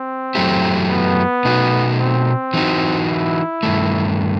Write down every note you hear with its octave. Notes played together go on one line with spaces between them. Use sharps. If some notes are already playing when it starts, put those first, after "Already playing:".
Already playing: C4
F#2 F#3 A3 E4 G4
B3
B2 A3 D#4 F#4
C4
E3 G3 D#4 F#4
E4
G2 D#3 A3